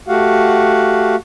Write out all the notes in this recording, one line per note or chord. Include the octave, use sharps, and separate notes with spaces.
A3 F#4 G4 F5 F#5